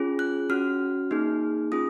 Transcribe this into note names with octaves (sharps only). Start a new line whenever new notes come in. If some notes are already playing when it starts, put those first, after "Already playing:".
Already playing: C#4 F4 G#4
F#6
C#4 F#4 F6
A#3 D#4 G#4
C#4 F4 G#4 D#6